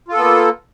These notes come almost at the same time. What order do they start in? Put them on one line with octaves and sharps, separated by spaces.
F4 A4 B3 A#3